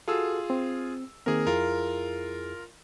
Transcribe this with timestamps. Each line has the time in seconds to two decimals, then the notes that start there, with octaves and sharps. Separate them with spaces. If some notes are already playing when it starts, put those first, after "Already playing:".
0.08 F4 F#4 G#4 A4 E6
0.50 C4
1.26 D#3 A#3 C4 G#4 A#4
1.47 F2 E4 F4 G#4 A#4